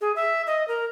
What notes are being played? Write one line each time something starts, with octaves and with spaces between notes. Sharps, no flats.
G#4
E5
D#5
A#4